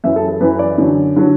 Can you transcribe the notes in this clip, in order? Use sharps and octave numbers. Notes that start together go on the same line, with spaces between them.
F#2 E3 E5
A4
A4
F#2 E3 B4
D5
F#2 D3 F#3
D3 F#3